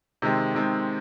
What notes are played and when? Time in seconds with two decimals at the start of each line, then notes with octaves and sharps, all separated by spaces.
0.22 C3 D#3 G#3 C4
0.55 C3 D#3 G#3 C4